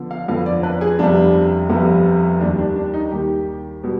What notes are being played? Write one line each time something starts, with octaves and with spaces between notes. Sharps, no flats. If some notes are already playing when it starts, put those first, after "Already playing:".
Already playing: D3 F3 B3
F5
F2 D3 F3 B3 F5
D5
B4
G#4
F1 F2 C3 G3 B3 D4
F1 F2 C3 G3 B3
D#2 D#3 G3 D4
D4
D4
D#4
D#2 D#3 G3 G4
B2 G3